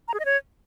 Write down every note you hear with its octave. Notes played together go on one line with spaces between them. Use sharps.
A#5
G#4
D#5
C#5